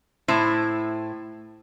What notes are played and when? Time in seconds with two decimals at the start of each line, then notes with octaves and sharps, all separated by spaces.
0.28 A2 E4 C5